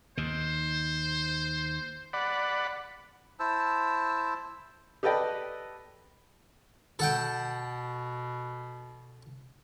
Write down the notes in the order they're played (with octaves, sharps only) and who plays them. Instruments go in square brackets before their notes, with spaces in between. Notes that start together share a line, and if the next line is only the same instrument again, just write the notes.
[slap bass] D#2 D#3 [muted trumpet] C5
[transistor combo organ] D5 F#5 B5
[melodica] E4 C5 A5 E6
[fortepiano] G4 A4 B4 D5 D#5 G5
[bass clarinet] B2 [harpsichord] A4 F#5 G5